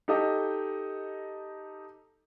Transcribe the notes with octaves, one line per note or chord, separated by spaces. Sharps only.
D#4 G4 A4 D#5